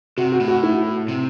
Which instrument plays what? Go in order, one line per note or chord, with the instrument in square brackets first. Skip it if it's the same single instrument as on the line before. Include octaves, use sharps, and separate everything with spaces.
[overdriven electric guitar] C3 [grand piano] F#4
[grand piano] F#4
[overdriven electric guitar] A2
[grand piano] F#4
E4
[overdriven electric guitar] C3